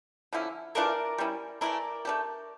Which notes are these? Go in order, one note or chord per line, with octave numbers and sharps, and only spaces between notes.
D3 F3 C#4 E4
E3 A3 D4 F4 A#4 D5
G3 C#4 E4
E3 A3 E4 A#4 D5
A3 D4 G4